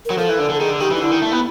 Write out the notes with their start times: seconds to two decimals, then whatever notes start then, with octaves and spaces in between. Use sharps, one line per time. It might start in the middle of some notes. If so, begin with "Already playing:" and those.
0.05 F#3 A#4
0.18 F3 A4
0.29 E3
0.39 D3
0.49 D3
0.54 A4
0.60 D#3 G#4
0.70 D3
0.80 D#3 G4
0.91 E3
0.96 D#4
1.01 D3 E4
1.11 D#3
1.22 A3
1.32 B3